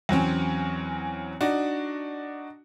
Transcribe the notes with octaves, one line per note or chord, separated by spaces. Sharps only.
E2 F#3 C4 C#4
D4 D#4 F#4